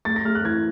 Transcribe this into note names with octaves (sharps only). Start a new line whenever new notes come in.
A3 A6
A#6
A3 F6
F#6
E3 G#6